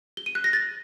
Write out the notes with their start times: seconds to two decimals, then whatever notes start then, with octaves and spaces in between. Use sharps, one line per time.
0.17 G7
0.26 D#7
0.35 F#6
0.44 A#6
0.53 A6